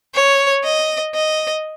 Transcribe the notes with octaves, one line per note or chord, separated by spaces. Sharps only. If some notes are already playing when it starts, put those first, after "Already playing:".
C#5
D#5
D#5